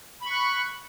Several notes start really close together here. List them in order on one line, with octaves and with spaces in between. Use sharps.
B5 C#6 F#6